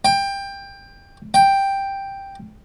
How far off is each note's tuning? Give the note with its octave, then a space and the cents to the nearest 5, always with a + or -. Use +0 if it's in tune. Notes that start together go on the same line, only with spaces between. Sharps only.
G5 +20
G5 +5